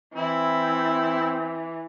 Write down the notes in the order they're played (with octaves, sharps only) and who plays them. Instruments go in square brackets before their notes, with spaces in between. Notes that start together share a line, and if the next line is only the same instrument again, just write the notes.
[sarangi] E3 [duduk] C4 [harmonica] E4